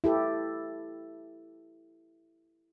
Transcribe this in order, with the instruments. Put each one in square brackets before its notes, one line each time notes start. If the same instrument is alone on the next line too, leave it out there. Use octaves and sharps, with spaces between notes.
[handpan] E4 G4 A4